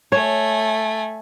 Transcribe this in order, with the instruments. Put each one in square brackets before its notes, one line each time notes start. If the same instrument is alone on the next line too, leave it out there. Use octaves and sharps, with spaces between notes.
[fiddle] A3 G#5 [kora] C#5